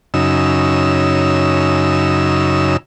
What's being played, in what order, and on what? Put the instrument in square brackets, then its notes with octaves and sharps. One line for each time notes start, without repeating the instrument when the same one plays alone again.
[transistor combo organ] F#2 C#3 D#4 E6